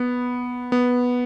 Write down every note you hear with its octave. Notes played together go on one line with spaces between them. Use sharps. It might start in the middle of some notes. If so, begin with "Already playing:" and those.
Already playing: B3
B3